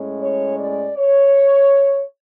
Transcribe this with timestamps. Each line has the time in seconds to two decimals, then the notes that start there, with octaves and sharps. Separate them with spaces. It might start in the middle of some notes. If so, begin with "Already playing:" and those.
Already playing: A2 G#3 C#4
0.20 C#5
0.59 D5
0.97 C#5